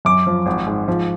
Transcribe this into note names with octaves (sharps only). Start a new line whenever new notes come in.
F#2 D6
F3
G#1
G#2
F3